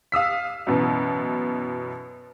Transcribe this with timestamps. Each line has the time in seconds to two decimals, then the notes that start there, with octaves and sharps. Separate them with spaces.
0.12 F5 D#6 E6 B6
0.67 F#2 B2 E3